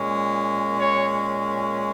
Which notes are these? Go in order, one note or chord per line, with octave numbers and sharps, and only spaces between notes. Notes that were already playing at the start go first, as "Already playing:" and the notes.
Already playing: A#2 G#3 C#4
C#5